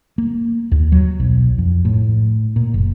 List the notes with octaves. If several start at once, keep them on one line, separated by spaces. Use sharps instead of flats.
A#3
D#2
F#3
B1
F2
A2
A#2
F#1